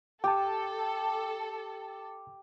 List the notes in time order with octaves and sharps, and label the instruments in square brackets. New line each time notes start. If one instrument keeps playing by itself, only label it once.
[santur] G4 [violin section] A4 [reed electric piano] G5 A5